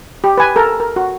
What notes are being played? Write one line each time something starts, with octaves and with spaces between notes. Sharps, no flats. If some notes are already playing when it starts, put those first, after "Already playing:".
G4
B4 G#5
A4 A#4
A#4
F#4